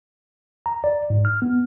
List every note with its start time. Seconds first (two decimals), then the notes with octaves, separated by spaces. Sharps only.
0.66 A#5
0.84 D5
1.10 G#2
1.25 F6
1.42 B3